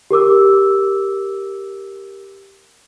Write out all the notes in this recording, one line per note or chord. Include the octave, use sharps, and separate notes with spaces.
G4 A#4 D6 E6